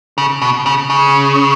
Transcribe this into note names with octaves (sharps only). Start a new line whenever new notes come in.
C#3
B2
C#3
C#3